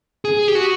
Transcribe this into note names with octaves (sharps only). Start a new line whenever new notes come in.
G#4
G4
F#4